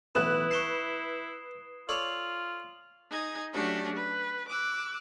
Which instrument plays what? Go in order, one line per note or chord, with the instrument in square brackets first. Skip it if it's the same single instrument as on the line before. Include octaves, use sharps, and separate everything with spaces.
[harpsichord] B1 A2 E3 [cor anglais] E4 [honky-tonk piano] B4 F#6 [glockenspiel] D#6 E7
[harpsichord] A5 B5 C#6 [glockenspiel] C7 E7 G7
[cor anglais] F4 [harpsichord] A4 C#5 D5 [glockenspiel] F7 F#7
[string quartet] D#4 G#4 G#6
F#3 A3 C#4 D4 F#4 G4
B4
D6 E6 F#6